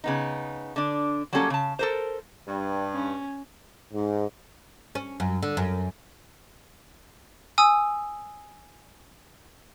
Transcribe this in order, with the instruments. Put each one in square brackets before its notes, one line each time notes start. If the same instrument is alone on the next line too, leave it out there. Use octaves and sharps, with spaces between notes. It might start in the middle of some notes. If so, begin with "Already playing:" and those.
[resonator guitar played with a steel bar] C#3 B3 D#4
D3 D4
F#3 G3 A#3 C#4 A4
C#3 A5
A4 A#4 C5
[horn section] G2
[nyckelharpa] C#4
[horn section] G#2
[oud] C#4
F#2
D3
F#2
[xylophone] G#5 D#6 E6